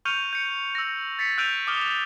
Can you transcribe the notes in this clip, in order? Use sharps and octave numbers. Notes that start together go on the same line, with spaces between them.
C#6 F6 G6 C#7 D#7 F7
G6 C#7
E6 A#6
A6 B6 C#7
E6 F#6 G6 D7 D#7 F7
D6 D#6 F6 G7